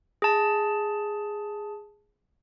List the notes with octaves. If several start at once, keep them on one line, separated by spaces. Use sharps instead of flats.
G#4 A5